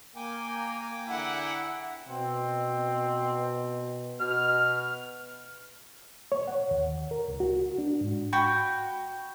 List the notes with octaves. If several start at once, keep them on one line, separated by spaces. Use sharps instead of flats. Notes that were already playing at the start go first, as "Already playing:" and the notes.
A#3 G5 G#5 A#5 D6
E2 D3 E4 F#5 A#5
B2 C4
B2 F6
C#5
F#5
D#2
A#4
C#2
F#4
D4
G#2
F#4 G5 B5